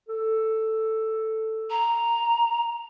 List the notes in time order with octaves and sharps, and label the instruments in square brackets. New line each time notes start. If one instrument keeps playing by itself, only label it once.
[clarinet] A4
[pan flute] A#5